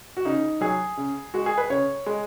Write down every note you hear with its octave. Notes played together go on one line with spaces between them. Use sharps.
F#4
C#3 D#4
F#3 G#4
C#3
G#3 F#4
G#4
B4
C#3 C#5
G#3